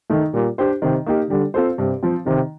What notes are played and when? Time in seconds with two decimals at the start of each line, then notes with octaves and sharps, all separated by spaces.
0.10 D#3 A3 D#4
0.33 A#2 G3
0.58 D4 G4 C5
0.82 C3 D#3
1.06 A#3 D#4 G4
1.30 D3 G3
1.54 C4 F4 A4 C5
1.78 G2 C3
2.03 F3 C4
2.26 C3 D#3